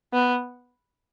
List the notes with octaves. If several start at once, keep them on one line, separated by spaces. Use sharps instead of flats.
B3